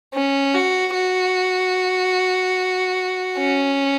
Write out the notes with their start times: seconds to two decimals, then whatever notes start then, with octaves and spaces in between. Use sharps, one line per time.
0.14 C#4
0.54 F#4
0.94 F#4
3.38 C#4